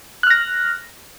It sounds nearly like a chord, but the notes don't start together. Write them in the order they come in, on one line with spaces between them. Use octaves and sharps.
F#6 F6 A#6